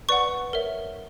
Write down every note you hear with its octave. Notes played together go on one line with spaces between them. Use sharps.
B4 D5 F#5 C#6
A#4 C#5 E5